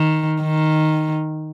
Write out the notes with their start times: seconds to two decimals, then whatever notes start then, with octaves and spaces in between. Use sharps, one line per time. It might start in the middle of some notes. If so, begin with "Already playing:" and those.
Already playing: D#3
0.42 D#3